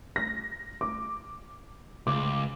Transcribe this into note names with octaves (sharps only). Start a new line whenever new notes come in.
A#6
D6
C#2 D6